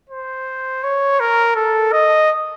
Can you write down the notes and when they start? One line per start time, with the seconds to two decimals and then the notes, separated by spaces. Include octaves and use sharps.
0.10 C5
0.84 C#5
1.20 A#4
1.56 A4
1.93 D#5